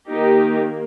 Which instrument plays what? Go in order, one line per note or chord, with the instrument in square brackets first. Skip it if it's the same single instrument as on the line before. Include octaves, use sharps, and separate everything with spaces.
[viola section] D#3 A#3 D#4 G4